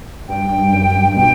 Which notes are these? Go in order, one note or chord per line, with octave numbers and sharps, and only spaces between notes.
G2 G5
G2
G2
F#2
G2
B2 G5